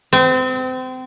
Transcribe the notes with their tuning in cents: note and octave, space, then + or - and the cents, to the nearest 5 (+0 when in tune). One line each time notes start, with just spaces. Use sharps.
C4 -30